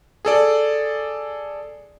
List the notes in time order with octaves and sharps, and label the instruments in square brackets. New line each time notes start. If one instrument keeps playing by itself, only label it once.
[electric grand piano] G#4 A4 D5